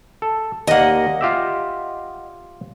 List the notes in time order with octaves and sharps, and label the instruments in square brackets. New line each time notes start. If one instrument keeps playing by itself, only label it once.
[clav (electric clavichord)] A4
[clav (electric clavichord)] D#2 A#3 [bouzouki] D#5 F#5
[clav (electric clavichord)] F4 G4 E5